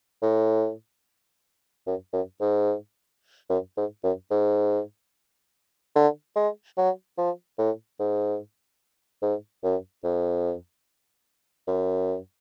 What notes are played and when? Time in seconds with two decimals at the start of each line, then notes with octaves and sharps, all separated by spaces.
0.22 A2
1.86 F#2
2.13 F#2
2.40 G#2
3.50 F#2
3.77 G#2
4.03 F#2
4.31 G#2
5.95 D3
6.36 G#3
6.77 F#3
7.18 F3
7.58 A2
7.99 G#2
9.22 G#2
9.63 F#2
10.04 F2
11.67 F#2